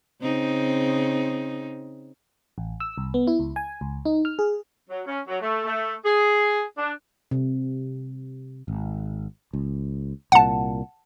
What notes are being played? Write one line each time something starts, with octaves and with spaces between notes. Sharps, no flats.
C#3 C4 D#4
A1
E6
C2
B3
E4
C#2
G#5
C#2
D#4
F6
G#4
F#3
C#4
F#3
A3
A3
G#4
D4
C3
G#1
C#2
C2 A#2 F#5 A5